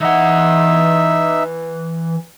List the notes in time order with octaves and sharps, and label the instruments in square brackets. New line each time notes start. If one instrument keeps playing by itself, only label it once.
[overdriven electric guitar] E3 F#5 [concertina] D#4 E5